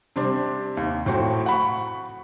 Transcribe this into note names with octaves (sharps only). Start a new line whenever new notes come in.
C3 G3 C4 D4
D#2
A2 C4 F#4 G5
F#5 B5 C#6